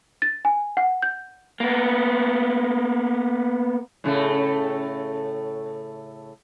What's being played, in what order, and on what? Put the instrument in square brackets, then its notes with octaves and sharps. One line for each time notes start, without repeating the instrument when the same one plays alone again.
[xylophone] A6
G#5
F#5
G6
[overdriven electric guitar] A#3 B3
[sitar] A2 C#3 A3